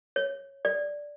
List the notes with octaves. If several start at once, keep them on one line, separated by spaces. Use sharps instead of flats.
C#5
D5